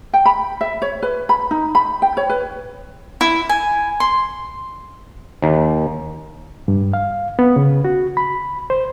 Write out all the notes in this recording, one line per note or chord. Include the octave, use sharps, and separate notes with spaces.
G5
B5
E5
C#5
B4
B5
D#4
B5
G5
C#5
B4
E4
G#5
C6
D#2
G2
F5
B3
C#3
F#4
B5
C5